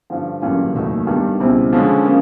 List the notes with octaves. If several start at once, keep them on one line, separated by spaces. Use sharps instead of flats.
G2 D3 F3
A1 G2 D3 F#3 A#3
F1 D#2 D#3 F#3 A3
G2 D#3 G3 B3 D4
C#2 B2 G3 C4 E4
D3 F3 G#3 C#4
C#3 F3 A#3